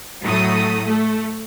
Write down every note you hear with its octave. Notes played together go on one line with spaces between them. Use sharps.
A2 F#3 A3 D#6
A3